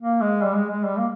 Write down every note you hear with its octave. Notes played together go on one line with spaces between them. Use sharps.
A#3
G#3
G3
G#3
G#3
G3
A#3